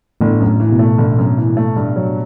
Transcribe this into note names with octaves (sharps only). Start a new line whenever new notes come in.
G1 A2
F#2
A2
E3
B2
A3
G1
F#2
E3
A3
G2
F#3